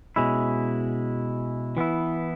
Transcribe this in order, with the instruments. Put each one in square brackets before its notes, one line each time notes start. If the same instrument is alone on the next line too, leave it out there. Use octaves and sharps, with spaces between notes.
[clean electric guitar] B2 G#3 C#4 E4
E3 B3 E4